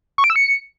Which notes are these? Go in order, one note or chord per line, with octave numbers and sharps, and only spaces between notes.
C#6
D7
E6
C#7